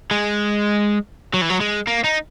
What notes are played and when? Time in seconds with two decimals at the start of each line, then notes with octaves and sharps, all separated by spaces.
0.11 G#3
1.34 F#3
1.42 E3
1.50 F#3
1.61 G#3
1.87 A#3
2.04 D#4